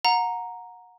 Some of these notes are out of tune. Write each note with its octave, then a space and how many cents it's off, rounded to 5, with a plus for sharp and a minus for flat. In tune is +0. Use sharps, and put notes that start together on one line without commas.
F#5 -25 A#5 +0